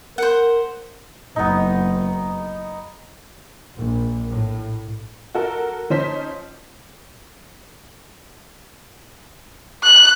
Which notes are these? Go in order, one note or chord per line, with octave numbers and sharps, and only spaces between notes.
A#4 C5 F#5
F#1 B3 D#4
A#1
A2
F#4 A4 A#4
F3 C#4 D#4 C5 B6
F#6